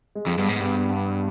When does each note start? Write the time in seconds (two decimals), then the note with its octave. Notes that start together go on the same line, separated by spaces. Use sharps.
0.15 G#3
0.26 F2
0.38 G2 B3
0.49 G#2
0.60 G2 B3
0.74 B3
0.90 B3